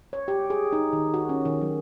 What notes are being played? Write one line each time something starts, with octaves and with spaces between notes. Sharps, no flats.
C#5
G4
G#4
D#4
D#3
F#4
C#4
D#3
F#3